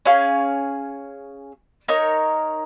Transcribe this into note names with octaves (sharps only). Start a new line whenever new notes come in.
C#4 G#4 F5
D#4 A#4 C#5